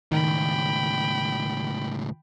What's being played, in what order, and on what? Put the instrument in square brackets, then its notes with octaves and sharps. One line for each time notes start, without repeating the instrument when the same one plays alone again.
[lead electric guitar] C#2 A2 [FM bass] D#3 [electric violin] G5 B5